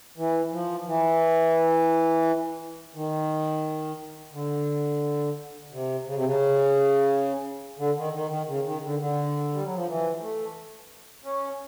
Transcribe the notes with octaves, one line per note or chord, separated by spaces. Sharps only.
E3
F3
E3
D#3
D3
C3
C#3
C3
C#3
D3
D#3
D#3
D#3
C#3
D#3
D3
D3
G3
F#3
F3
E3
A3
C#4